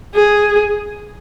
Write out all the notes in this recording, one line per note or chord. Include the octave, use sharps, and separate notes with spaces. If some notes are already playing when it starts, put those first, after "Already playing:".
G#4